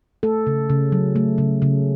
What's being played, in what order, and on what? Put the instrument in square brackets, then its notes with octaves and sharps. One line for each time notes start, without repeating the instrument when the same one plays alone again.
[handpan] A3 A4
C#3
C#3
F#3
A3
C#3
C#3